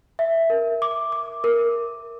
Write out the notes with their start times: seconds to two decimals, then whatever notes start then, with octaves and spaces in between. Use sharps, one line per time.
0.19 E5
0.50 A#4
0.82 D6
1.12 D6
1.44 A#4